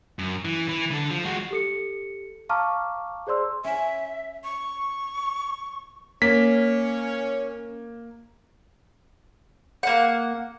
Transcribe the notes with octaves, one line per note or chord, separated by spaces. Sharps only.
F#2
E3
E3
D3 A4
F3
G#3 F#4
G4 A4 C#7
F5 A5 A#5 C#6 D6 F6
G#4 C5 D5 C6 E6
C#4 E5
C#6
A#3 C#4 B6
A#3 F#5